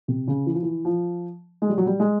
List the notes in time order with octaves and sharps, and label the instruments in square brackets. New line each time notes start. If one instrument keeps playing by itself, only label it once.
[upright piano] C3
C#3
E3
F3
E3
F3
G#3
G3
F#3
G3
G#3